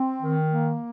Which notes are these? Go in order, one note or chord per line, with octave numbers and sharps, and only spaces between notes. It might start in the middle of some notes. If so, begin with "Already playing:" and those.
Already playing: C4
D#3
A#3